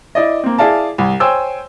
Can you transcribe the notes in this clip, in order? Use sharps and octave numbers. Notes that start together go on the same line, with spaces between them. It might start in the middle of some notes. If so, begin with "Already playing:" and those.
E4 D5 D#5
A#3 C4
E4 G#4 D5 F5 A5
C2
C5 C#5 G5 G#5 E6